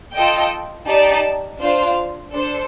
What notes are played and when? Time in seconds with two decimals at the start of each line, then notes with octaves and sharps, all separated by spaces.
0.14 F4 A4 D#5 G5
0.87 D#4 G4 D5 A5
1.61 D4 F4 C5 F5
2.33 D4 A4 C5